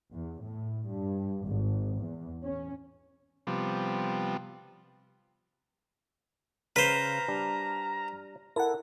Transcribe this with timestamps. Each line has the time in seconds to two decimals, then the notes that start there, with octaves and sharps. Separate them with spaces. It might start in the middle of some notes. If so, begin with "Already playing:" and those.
0.12 E2
0.42 A2
0.87 G2
1.46 G#1
1.97 E2
2.43 C#4
3.47 C3 F3 G3 B3
6.76 C#3 B4 C5 A#5 F6
7.28 G3 D4
8.56 E4 A4 A#4 F#5